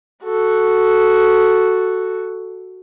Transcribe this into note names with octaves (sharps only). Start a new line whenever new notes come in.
F#4 A4